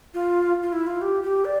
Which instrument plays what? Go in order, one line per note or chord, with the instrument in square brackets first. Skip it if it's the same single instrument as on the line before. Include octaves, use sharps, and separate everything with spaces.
[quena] F4
F4
E4
F4
G4
G4
D5